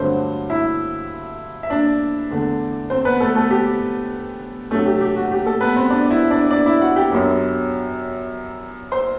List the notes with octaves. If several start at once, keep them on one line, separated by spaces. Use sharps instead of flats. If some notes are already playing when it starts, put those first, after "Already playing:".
Already playing: G2 D3 F#3 A3 C4 C5
E4 E5
E5
D4 D5
E2 D3 A3
C4 C5
B3 B4
A3 A4
A3 A4
G4
C3 F#3 A3 D4 A4
G4
G4
F#4
G4
A3 A4
B3 B4
C4 C5
D4 D5
E4 E5
D4 D5
D4 D5
E4 E5
F#4 F#5
G4 G5
F#2 F#3 B3 D4
C5 C6